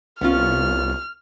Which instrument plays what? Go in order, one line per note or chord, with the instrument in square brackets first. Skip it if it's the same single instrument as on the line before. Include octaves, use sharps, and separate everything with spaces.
[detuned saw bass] C2 [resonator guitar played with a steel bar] B3 C#4 F4 [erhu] F6